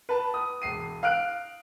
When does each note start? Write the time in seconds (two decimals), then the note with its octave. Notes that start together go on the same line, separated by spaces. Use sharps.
0.09 B4 A5
0.34 D#6
0.62 E1 C7 D#7
1.03 F5 F6 F#6 D7